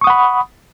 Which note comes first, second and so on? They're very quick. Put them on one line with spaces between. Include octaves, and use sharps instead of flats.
C#6 D#6 F#5 B5